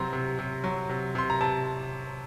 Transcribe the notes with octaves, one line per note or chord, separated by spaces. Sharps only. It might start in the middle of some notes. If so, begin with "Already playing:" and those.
Already playing: C3 F#3 C4 A#5 C6
C3
C3
F#3
C3
C3 C6
A#5
C3 A5